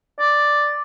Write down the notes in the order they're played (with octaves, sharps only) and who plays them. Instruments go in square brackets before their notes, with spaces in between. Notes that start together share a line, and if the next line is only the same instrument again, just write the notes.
[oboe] D5